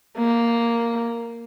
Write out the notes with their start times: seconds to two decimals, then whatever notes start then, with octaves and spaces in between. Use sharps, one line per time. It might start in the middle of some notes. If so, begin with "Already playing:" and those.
0.18 A#3